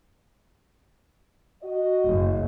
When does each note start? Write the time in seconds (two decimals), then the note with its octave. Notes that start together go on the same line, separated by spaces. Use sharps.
1.63 F#4 D#5
2.05 F#1